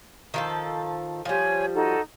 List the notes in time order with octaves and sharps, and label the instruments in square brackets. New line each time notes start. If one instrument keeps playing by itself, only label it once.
[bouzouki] D#3 F3 A4
[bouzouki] F3 G3 [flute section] C#5 G#5
[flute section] D#4 F#4 A4